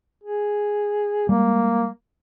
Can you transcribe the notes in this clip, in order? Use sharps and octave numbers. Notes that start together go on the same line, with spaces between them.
G#4
G3 G#3 A#3